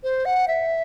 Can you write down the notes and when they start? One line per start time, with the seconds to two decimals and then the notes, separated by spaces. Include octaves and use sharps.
0.03 C5
0.25 F#5
0.48 E5